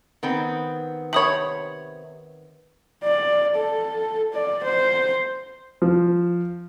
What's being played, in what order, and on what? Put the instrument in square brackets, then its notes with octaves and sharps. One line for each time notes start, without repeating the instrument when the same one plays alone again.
[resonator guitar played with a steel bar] D#3 B3 C4
[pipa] C3 C#5 [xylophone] B5 D#6 F#7
[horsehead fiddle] D5
A4
D5
C5
[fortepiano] F3